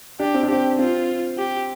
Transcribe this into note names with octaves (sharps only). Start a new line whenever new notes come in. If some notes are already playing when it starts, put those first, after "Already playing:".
D4 G4
C4
D4
C4 G4
C4 F4
G4